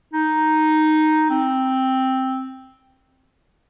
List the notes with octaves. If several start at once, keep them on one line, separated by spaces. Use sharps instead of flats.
D#4
C4